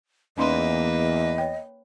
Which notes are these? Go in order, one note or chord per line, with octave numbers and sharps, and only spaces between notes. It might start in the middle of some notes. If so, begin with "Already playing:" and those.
E2 A#3 C#4 D#4 B4 D#5 C6
C#5 G5